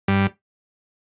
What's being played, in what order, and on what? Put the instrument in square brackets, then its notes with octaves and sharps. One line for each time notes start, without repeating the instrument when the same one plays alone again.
[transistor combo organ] G2 G3